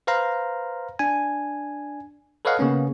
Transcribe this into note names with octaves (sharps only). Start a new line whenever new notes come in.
B4 C5 F5 A#5
D4 G#5
A4 B4 C#5 D#5 F5 F#5
C#3 A#3 B3 C#4